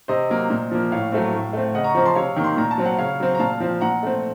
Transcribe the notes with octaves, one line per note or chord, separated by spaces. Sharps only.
C3 C5 D#5
F#3 A#3
A#2
F3 A#3
A2 C#5 F5
F#3 A3 C4
A2
A3 C4
C#3 D#5 F#5
A#5 C#6
F3 C4 A#5 C#6
A5 C6
C3 C#5 F5
D#3 A#3
C6
A#2 A#5
A5
F#3 C4
F#5
C#3 C#5 F5
F#3 C4
A#5
A#2 F5 A5
F3 C4
A#2 F#5 A#5
A3 C4